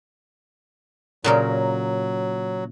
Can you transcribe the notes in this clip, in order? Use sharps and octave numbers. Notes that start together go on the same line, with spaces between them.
A#2 C#3 F#3 A#4